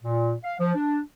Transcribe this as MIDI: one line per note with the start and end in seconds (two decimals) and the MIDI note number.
0.03 0.33 46
0.44 0.55 77
0.59 0.74 53
0.74 0.98 62